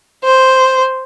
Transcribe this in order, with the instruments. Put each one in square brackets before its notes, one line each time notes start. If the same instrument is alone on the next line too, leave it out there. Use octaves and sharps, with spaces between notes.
[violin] C5